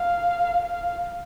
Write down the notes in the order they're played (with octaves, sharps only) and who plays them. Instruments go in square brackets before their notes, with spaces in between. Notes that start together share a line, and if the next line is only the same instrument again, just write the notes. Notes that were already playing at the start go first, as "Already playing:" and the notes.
Already playing: [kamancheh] F5
F5